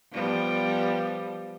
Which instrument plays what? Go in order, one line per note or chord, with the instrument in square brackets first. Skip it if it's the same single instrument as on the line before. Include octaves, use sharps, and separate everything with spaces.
[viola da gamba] F3 G3 B3